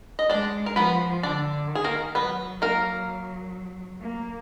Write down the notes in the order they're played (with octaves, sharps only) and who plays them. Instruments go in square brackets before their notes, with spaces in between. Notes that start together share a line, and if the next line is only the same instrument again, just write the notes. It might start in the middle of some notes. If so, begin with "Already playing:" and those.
[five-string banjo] D#5
[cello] G#3 [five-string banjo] D4 D5
[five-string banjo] A#4
[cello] F3 [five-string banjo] B3 B4
[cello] D3 [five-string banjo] D4 D5
[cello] D#3
[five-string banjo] G#4
A#3 A#4
[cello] F#3 [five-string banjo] B3 B4
[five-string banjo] A#3 A#4
[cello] A#3